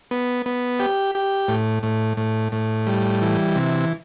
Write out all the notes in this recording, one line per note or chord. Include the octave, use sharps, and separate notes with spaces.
B3
B3
G4
G4
A2
A2
A2
A2
G3
E3
C3